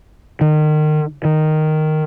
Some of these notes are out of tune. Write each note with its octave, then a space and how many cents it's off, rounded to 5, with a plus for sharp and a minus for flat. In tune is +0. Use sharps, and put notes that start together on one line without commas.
D#3 -30
D#3 -5